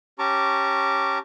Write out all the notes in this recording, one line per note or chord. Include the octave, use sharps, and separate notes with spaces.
C#4 G4 A5 A#5 C#6 D6